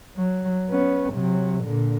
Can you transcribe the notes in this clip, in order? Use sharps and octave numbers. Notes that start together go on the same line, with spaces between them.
F#3
B3 C#4
C3 F#3
A#2 D3